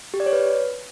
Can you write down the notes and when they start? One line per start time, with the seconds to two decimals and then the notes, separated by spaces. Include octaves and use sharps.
0.14 G4
0.20 D5
0.26 C#5
0.33 B4